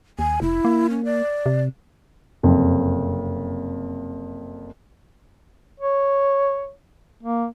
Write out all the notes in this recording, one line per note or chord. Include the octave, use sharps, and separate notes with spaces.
D#2 G#5
F1 E4
A#3
C#4
D5
C3
F#1 F2 C3
C#5
A#3